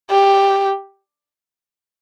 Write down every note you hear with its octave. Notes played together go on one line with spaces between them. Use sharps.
G4